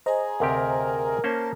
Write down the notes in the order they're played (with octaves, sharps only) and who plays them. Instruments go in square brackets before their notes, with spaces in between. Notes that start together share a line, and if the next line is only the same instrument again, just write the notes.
[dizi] G#4 [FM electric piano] C5 D#5 A#5
[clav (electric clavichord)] D2 C3 G4 [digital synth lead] A#4
[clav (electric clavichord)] A#3 C#4 C5 [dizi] A5